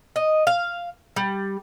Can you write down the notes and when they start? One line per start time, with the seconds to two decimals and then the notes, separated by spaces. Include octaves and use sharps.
0.16 D#5
0.47 F5
1.16 G3